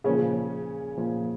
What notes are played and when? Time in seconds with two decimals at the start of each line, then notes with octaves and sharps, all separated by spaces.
0.04 A#2 C#3 F3 C#4
0.97 A#2 F3